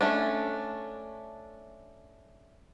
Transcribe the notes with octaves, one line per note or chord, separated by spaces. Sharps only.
A3 C#4 D4